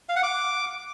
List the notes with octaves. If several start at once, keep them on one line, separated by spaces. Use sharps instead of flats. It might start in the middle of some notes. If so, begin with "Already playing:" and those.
F5
F#5
D6